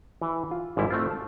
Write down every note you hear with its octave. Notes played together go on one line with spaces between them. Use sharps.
E3
F4
G#1 G#2 G3 E4
A3 C4 F4
A5